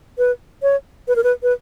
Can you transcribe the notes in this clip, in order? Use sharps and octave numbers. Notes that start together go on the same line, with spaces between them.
B4
C#5
B4
A#4
B4
B4